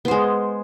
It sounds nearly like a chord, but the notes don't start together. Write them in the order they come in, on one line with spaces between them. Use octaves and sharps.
B3 C5 G#3